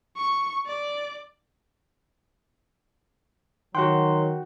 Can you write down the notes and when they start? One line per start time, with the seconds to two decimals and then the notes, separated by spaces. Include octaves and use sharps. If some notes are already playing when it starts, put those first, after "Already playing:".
0.17 C#6
0.67 D5
3.75 D#3 F#3 F#4 F#5 G5 C6